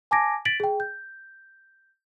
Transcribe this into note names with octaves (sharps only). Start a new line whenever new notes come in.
G#5 A5 D6 G#6 A#6 D7
A6 B6 D7 F#7
G#4 G5
G6